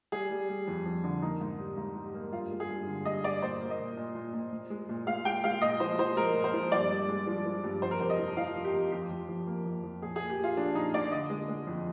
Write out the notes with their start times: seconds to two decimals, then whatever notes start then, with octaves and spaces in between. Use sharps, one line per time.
0.12 G3 G#4
0.31 G3
0.49 G3
0.67 F2
0.86 F2
1.04 D3
1.22 A#3 D#4
1.41 G#2
1.59 G3
1.77 G#2
1.96 G3
2.14 A#3
2.32 G2 F4
2.51 G#3
2.60 G#4
2.69 G2
2.87 D3
3.05 G2 D#5
3.24 G#3 D5
3.42 A#2 C5
3.61 A#3
3.70 D#5
3.79 A#2
3.97 A#2
4.15 A#2
4.33 A#2
4.52 A#2
4.70 G#3
4.89 A#2
5.07 G#3 F5
5.25 G#3 G5
5.44 G#3 F5
5.62 A#2 D#5
5.80 F3 C5
5.99 F3 C5
6.17 G#3 A#4
6.36 A#2
6.44 C5
6.54 F3
6.72 G2 D5
6.91 G2
7.08 G#3
7.27 F3
7.45 F3
7.64 G2
7.82 F2 C5
7.91 A#4
8.00 C3 C5
8.10 D#5
8.19 F3
8.37 F3 F5
8.56 F2
8.64 G4
8.74 F2
8.92 F2 G4
9.11 F2
9.28 F2
9.47 A#3
9.65 F2
9.84 F2
10.02 A#2 G#4
10.16 A#3 G#4
10.30 G4
10.39 A#2 F4
10.57 F3 D4
10.75 A#2 D#4
10.94 A#2 D5
11.12 D3 D#5
11.30 G#3
11.48 G#3
11.67 F2